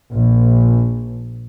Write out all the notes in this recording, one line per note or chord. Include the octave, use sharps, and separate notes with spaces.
A#1